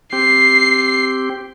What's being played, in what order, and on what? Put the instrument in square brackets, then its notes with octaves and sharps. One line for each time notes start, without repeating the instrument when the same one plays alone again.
[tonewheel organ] C4 G4 [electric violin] C7